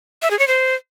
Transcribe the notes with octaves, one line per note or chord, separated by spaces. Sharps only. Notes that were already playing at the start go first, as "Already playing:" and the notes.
E5
G#4
C#5
C5